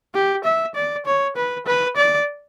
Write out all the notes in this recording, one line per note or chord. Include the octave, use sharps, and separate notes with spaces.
G4
E5
D5
C#5
B4
B4
D5